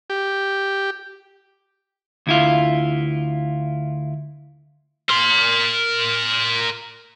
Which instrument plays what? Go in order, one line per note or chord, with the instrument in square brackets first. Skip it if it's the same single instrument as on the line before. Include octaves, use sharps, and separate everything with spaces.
[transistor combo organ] G4
[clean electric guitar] D2 E4 F4
[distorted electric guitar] A#4 C6